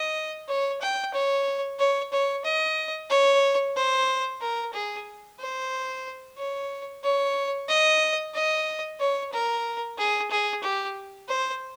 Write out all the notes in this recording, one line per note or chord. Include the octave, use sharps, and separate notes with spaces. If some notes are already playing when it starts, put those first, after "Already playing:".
Already playing: D#5
C#5
G5
C#5
C#5
C#5
D#5
C#5
C5
A#4
G#4
C5
C#5
C#5
D#5
D#5
C#5
A#4
G#4
G#4
G4
C5